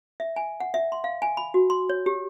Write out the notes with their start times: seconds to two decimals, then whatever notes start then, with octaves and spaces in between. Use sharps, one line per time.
0.20 E5
0.36 G#5
0.60 F#5
0.74 E5
0.92 C6
1.04 F5
1.22 G#5
1.37 B5
1.54 F#4
1.70 C6
1.89 C#5
2.06 G4